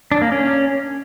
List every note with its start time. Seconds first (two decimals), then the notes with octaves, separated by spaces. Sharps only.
0.12 D4
0.22 A#3
0.32 C#4